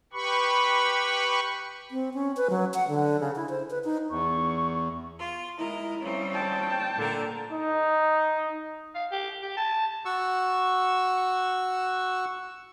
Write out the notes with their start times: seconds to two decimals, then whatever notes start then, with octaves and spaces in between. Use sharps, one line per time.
0.13 G4 B4 B5 C#6
1.91 C4
2.14 C#4
2.37 B4
2.50 F#3
2.74 F#5
2.88 D3
3.20 C#3
3.36 E4
3.49 C5
3.70 B4
3.84 D#4
4.10 E2 C#6
5.19 F4
5.58 G#3 E4 A#4 D#5
6.01 C#3 G3 C4
6.34 G5 A5
6.96 A#2 D3 A#4
7.52 D#4
8.95 F5
9.12 G4
9.42 G4
9.57 A5
10.05 F#4 C#6 E6